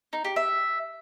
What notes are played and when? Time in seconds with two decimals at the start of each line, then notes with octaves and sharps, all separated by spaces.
0.13 D#4
0.25 G4
0.36 E5